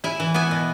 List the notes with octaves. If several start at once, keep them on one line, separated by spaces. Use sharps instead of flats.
E4 E5 G#5
E3
B3 E5 G#5
B2